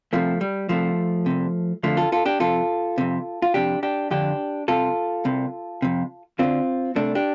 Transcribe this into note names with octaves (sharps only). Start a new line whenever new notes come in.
C2 C3 F3 A3
G3
C2 C3 F3 A3
C2 C3
F2 D3 F3 A3
F4 A4
F4 A4
D4 G4
F2 C3 F4 A4
F2 C3
F4
F2 C3 D4 G4
D4 G4
F2 D3 D4 G4
C2 C3 F4 A4
C2 C3
F2 C3
D2 D3 C4 F4
C2 C3 A3 D4
D4 G4